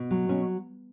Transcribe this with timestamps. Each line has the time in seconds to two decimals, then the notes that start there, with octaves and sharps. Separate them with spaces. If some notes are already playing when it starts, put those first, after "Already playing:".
Already playing: B2
0.11 F#3
0.29 B2 C#4